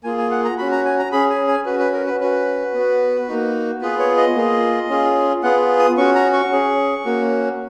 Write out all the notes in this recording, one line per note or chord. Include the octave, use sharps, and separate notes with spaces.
A#3 F4 G#4 G#5
G#5
F#5
A#5
C#4 F#4 B5
A#5
G#5
A#5
C#4 G#4 B5
G#5
G#5
C#4 F#4 B4
B4
A#4
B4
C#4 F#4 B4
B3 F#4
A#3 D#4 F#4
B3 F4 G#4 B4
C#5
D#5
A#3 F4 G#4
C#4 F4 G#4
B3 F4 G#4 F#5
D#6
C#4 F#4 C#6
A#5
C#6
C#4 G#4
A#3 C#4 F#4